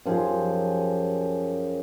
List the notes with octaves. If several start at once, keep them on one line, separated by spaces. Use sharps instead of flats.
F#2 F3 G4 G#4